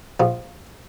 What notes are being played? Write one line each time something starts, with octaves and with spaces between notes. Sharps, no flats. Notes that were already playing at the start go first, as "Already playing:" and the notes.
A#1 F3